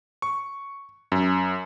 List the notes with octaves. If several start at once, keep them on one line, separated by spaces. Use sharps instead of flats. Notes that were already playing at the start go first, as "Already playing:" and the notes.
C#6
F#2